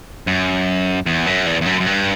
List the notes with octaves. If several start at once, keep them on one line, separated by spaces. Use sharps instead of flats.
F#2
E2
F#2
E2
E2
F#2
F#2
G2